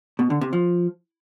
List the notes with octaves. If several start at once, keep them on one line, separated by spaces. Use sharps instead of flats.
B2
D3
C3
F3